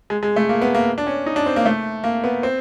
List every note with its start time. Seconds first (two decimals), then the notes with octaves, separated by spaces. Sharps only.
0.10 G#3
0.23 G#3
0.36 A3
0.49 A#3
0.62 B3
0.75 A#3
0.98 D4
1.07 C#4
1.26 D#4
1.36 D4
1.46 C4
1.56 A#3
1.65 A3
2.04 A#3
2.24 B3
2.43 C4